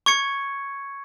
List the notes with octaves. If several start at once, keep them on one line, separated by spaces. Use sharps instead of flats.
C#6 G#6 C#7